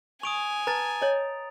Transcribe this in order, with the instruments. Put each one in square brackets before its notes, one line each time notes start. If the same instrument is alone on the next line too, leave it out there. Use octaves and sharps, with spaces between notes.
[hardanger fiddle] G#5 [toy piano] C#6 [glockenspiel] D#6 D7 F7
[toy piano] B4 A5 [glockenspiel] A#5 A6
[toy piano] C#5 D#5